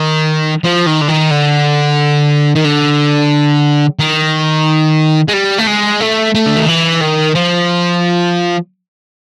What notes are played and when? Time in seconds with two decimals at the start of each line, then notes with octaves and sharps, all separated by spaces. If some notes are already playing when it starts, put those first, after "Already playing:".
Already playing: D#3
0.64 F3
0.87 D#3
1.02 D3
1.09 D#3
1.31 D3
2.56 D#3
2.65 D3
3.99 D#3
5.28 G#3
5.33 G3
5.58 A3
5.67 G#3
6.00 A3
6.35 A3
6.46 D3
6.57 D#3
6.68 E3
7.01 D#3
7.35 F3